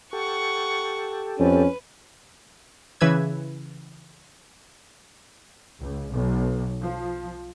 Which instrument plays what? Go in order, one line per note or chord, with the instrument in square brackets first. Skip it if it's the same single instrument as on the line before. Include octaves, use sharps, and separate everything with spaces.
[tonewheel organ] G4 A4 [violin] F#5 C#6
[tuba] F2 [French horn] C#4 [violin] B4
[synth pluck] C#3 E3 B4 E6 G#6
[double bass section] C#2
B1
F3